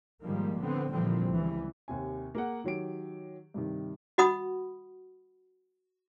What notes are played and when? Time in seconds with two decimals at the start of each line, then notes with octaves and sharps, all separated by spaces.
0.23 G#2 D#3 F3 G3 A#3
0.61 A2 D3 B3 C4
0.91 A#2 D3 E3 F3 G3 C4
1.32 C#2 E3 G3
1.88 D#2 C3 G#5
2.35 A#3 G#4 F#5
2.64 D#3 F#3 G4 D7
3.54 G2 C3 D#3
4.18 F#4 D#5 F#5 B5 D#6